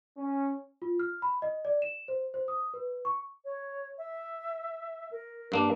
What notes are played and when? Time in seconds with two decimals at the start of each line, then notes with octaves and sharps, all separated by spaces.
0.17 C#4
0.82 F4
1.00 F6
1.22 B5
1.42 D#5
1.65 D5
1.82 E7
2.08 C5
2.34 C5
2.48 D#6
2.74 B4
3.05 C#6
3.45 C#5
3.98 E5
5.11 A#4
5.52 G2 A#3 D4